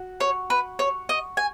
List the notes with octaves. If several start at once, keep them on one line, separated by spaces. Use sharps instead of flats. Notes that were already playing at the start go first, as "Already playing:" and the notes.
Already playing: F#4
C#5
B4
C#5
D#5
G#5